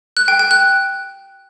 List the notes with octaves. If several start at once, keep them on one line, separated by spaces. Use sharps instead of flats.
F#6
G5
G5
F#6